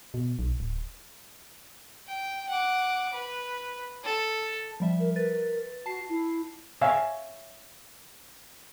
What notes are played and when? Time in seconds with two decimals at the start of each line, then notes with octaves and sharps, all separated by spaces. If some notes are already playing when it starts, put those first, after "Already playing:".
0.14 B2
0.39 B1
0.60 D1
2.07 G5
2.50 F#5 D6
3.14 B4
4.05 A4
4.80 F3 G3 E5
4.99 A#4
5.16 A#4 B4 A6
5.86 F#4 A5 C7
6.09 E4
6.81 C#5 E5 F5 G#5